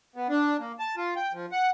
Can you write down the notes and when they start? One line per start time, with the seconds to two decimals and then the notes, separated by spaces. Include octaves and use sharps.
0.16 B3
0.29 D4
0.60 A#3
0.79 A5
0.97 F4
1.16 G5
1.33 F3
1.52 F#5